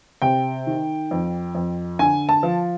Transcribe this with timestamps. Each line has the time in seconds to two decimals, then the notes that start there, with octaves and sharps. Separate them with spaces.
0.22 C3 G5
0.67 D#3
1.11 F2
1.55 F2
1.99 D3 G#5
2.29 A5
2.43 F3